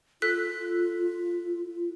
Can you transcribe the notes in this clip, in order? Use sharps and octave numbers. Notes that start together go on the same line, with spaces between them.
F4 A4 F#6 B6